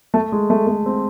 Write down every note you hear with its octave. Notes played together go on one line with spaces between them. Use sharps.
A3
G#3
A3
A3
C4